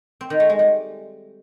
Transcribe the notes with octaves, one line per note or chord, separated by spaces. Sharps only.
C4
D#3
A3
G#3
G3